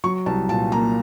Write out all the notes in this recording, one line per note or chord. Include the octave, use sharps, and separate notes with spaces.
F#3 C#6
C2 A5
A#2 A5
A#3 A#5